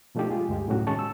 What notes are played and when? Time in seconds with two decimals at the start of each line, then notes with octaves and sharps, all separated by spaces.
0.15 B2 F3 A3 D4 D#4 G4
0.30 G#3 F4 G#4
0.49 D2 G2 G#3 G4
0.68 A2 C3 F#3 C#4 F#4
0.86 D#3 G#3 C#4 A5 C#6
0.99 E6